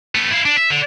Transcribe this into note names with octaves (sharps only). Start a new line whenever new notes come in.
A3 B3
E4 F4
D4
E5
D3